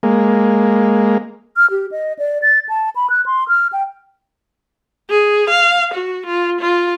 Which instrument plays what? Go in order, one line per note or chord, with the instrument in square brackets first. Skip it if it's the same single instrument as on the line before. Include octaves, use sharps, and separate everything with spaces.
[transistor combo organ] G#3 A#3
[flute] F6
G4
D#5
D5
A6
A5
B5
F#6
C6
F6
G5
[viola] G#4
F5
F#4
F4
F4